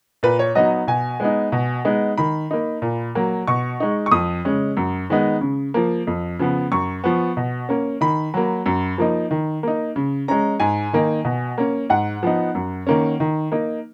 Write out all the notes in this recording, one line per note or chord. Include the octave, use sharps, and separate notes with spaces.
A#2 B4
C#5
F#3 B3 D#4 D#5
B2 G#5
G#3 B3 D#4
B2
G#3 B3 D#4
D#3 B5
A#3 D#4
A#2
F#3 A#3
B2 C#6
G#3 D#4
C#6
F2 D#6
C#3 G#3 C#4
F#2
D#3 G#3 B3 D#4
C#3
F3 A#3
F2
C#3 F3 B3
F#2 C#6
F3 B3
B2
A#3 C#4
D#3 B5
F#3 A#3
F#2
F3 A#3 D#4
D#3
A#3 D#4
C#3
G#3 C#4 A#5
G#2 G#5
D#3 A#3 D#4
B2
A#3 C#4
G#2 F#5
F3 B3 D#4
F#2
D#3 A#3 C#4
D#3
A#3 D#4